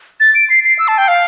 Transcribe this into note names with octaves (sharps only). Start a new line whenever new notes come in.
A6
D7
C7
C7
E6
A5
G5
F5